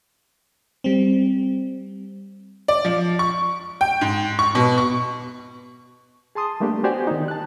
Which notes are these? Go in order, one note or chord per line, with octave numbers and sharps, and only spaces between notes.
G3 C4
D5
F3
C#6
G5
G#2
C#6
B2
C#6
G#4 A5 C6 D#6
G3 A3 A#3 D4 G4
B3 F#4 G4 C5 D5 G#5
D#3 D#4
A5 F#6